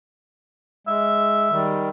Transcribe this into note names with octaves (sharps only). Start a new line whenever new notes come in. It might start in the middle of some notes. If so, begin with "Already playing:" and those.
G#3 E5
D#3 G3